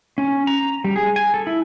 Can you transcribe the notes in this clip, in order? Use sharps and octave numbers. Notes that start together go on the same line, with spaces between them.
C#4
A#5
G3
G#4
G#5
A4
E4